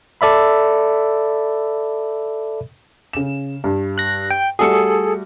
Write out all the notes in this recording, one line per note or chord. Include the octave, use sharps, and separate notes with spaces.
A4 D5 E5 B5
C#3 E7
G2
F#6 A#6
G5
G3 A3 F#4 G#4 A4 C#7